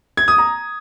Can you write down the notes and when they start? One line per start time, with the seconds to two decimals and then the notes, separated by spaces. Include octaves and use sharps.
0.17 G#6
0.28 D#6
0.38 A#5